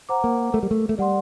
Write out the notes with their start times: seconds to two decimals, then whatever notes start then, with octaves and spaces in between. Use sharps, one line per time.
0.09 C5 F#5 A#5 D6
0.24 A#3
0.53 A3 A#4
0.63 G3
0.71 A3
0.89 A3
0.98 G3 D5 F#5 C6